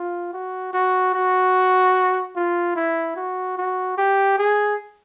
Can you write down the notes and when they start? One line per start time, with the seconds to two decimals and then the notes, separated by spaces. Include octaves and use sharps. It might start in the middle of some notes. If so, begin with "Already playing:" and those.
Already playing: F4
0.34 F#4
0.73 F#4
1.14 F#4
2.36 F4
2.76 E4
3.16 F#4
3.57 F#4
3.98 G4
4.38 G#4